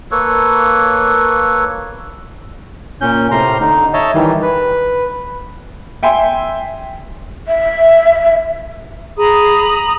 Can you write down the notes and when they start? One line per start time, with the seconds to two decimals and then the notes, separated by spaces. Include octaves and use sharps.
0.11 A#3 A4 B4 C#5
3.01 A#2 C#4 G6
3.31 A2 C3 A#5 C6 F6
3.60 D3 D#4
3.94 C#5 D#5 E5 A5
4.14 D#3 E3 G3
4.42 B4
6.03 E5 G5 G#5 C6
7.47 E5
9.17 G#4 A#5 B5 D#6